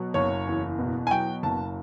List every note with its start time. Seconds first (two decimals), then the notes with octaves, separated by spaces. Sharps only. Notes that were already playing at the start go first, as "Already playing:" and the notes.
Already playing: B2 F#3
0.14 F#1 C#5
0.47 E2
0.79 B2
1.07 G#5
1.11 F#3 G5
1.43 F#1 A5